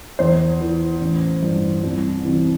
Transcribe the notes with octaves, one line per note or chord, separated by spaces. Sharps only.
E2 C5
E3
A1
G2 E3
C2
C3 E3